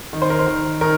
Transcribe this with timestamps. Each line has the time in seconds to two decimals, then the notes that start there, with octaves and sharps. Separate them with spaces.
0.13 D#3
0.22 C5
0.30 A#4
0.39 C5
0.47 D#3
0.81 D#3 A#4